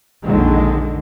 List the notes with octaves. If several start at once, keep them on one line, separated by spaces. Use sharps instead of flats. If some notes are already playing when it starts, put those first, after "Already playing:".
A#1 F2 D3 D#3 G#3